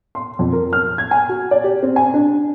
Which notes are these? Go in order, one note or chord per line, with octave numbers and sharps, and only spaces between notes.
C6
F2
A#4
F6
G#6
G#5
F#4
D5
G4
C4
G#5
D4